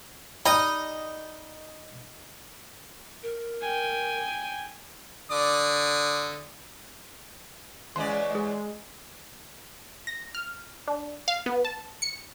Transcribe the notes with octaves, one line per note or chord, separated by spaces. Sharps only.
G3 D#4 D#5 A#5 D#6
A#4
G5 G#5
D3 D5 D#6
E2 C#3 G#3 C#4 D5 C6
G#3 G#4 D#5
A#6
F6
D4
F5
B3
A5
C#7